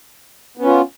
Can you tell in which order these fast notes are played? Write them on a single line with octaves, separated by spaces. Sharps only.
B3 C#4 F4